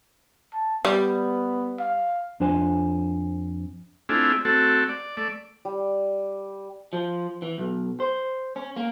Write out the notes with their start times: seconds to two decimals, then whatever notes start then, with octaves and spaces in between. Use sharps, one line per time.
0.54 A5
0.85 G3 B3
1.80 F5
2.40 F2 D4 F4 C5 G#5
4.09 A3 C4 D4 E4 F4 G#4
4.45 A3 C4 F#4 A4
4.89 D5
5.17 A3 D5
5.65 G3
6.93 F3
7.42 E3
7.58 B1
8.00 C5
8.56 C#4
8.76 A#3